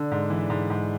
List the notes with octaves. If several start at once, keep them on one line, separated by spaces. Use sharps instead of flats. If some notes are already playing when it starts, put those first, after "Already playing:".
Already playing: D3 D4
G#2
E3
G#2
G#2